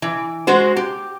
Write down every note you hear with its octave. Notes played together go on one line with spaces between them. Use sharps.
E3
G#3 F#4 C5
G4